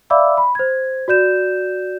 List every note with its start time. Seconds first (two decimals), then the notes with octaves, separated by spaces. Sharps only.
0.10 D5 E5 F5 B5 D6 E6
0.37 B5
0.55 C5 G#6
1.08 F#4 D5 G6 E7